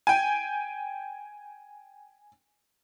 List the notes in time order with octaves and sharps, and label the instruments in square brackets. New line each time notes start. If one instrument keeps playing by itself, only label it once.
[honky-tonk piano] G5 G#5